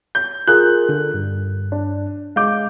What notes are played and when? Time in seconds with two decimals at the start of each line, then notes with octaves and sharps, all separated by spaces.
0.15 G6
0.47 F4 G#4 A#4 F#6
0.89 D3
1.14 G2
1.72 D4
2.36 G#3 F5 D6 G6